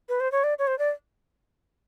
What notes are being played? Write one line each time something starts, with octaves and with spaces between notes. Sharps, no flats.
B4
C5
C#5
D5
C#5
C5
D5